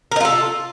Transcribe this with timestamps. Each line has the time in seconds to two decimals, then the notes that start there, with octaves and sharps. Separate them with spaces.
0.12 A#4
0.16 D#4
0.20 F4
0.25 A4